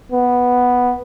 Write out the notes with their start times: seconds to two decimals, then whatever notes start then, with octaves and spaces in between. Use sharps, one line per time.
0.12 B3